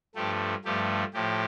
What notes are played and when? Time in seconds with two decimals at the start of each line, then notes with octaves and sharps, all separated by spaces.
0.15 G2 F3 A3 G4
0.65 G2 F3 A3 G4
1.14 A2 F3 G4